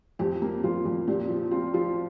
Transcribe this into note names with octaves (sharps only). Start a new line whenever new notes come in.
F2 G4
A#3
F2 F4
F2
A#2 G4
F3
C4 F4
F3 F4